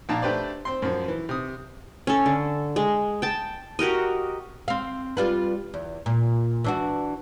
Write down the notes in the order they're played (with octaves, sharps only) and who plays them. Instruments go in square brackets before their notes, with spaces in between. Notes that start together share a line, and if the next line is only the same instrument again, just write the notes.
[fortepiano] A#1 A#3 D4 A5 A#5
A3 D4 G4 B4 C5 D5
C4 C6
F#2 F3
E3
C3 D#6
[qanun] C#4 A4
D3
G#3
G5 A5
F#4 G4 A#4 D#5
[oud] C4 F5
G3 F4 B4
E2
A#2
E3 D4 F#4